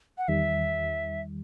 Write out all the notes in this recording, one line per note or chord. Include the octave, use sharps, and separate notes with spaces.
F#5
E2 D#3 G3 E5